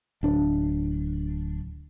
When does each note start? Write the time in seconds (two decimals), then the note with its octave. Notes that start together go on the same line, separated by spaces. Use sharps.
0.23 D1 D4